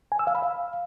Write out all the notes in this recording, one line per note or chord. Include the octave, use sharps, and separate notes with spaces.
G#5
E6
F5
B5
F5